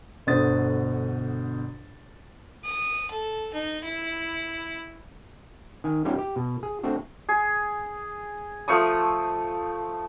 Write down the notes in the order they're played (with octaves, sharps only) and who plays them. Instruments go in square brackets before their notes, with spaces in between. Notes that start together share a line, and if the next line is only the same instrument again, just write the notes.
[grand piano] G1 B2 D3 C5 D#6 A6
[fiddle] D#6
A4
D#4
E4
[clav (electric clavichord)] D#3 G#5
G3 B3 C#4 D#4 F4 G4
G4
B2
G#4
A3 C4 D4 F#4
[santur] G#4
F3 A3 C#6 D#6